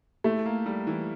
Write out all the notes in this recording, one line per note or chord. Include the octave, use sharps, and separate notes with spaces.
A3 E4
A#3
G3
E3